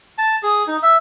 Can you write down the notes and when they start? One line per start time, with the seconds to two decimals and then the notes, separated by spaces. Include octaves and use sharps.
0.18 A5
0.43 G#4
0.67 D#4
0.83 E5